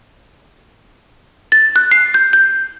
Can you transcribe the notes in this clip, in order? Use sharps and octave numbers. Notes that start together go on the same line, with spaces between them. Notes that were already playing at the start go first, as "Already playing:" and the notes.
A6
F#6
C7
G6
G6